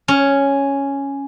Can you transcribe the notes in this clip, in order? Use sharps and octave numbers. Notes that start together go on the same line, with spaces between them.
C#4